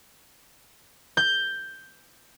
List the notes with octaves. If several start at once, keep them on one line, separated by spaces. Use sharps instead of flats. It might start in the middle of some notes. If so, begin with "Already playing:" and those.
G6